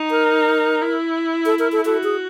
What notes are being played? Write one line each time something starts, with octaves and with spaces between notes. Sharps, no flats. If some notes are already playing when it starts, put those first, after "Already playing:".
Already playing: D#4
A#4
E4
A4
A#4
A4
F#4 A4
G#4